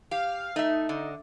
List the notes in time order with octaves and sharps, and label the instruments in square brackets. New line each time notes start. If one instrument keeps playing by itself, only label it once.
[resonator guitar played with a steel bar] G4 [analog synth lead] F5
[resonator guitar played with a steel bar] A3 E5 [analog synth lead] D#4
[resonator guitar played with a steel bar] D3